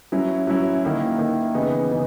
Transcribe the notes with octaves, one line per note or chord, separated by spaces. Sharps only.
F#3 C#4 E4
F#3 C#4 E4
D#3 A#3 E4
D#3 A#3 E4
C#3 E3 B3 D#4
C#3 E3 B3 D#4